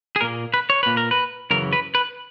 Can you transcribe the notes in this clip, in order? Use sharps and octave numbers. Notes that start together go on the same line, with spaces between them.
G#4
A#2 A#3 A#4
B4
C#5
A#2 A#3 B4
A#4
B4
F#2 C#3 E3 A#4
B4
B4